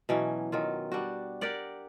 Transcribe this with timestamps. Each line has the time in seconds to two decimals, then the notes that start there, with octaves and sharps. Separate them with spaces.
0.09 B2 E3 F#3 C#4
0.52 D#3 F#3 F4
0.92 G3 D4 F#4
1.41 G4 A#4 D5 F#5